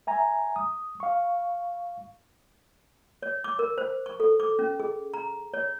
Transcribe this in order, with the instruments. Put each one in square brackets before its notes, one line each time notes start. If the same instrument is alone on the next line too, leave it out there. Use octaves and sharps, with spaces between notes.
[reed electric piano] E5 G#5 A#5
D#6
F5 C#6
[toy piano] C#5
D6
A#4
C5
C#6
A4
D6
C#4
G#4
A#5
C#5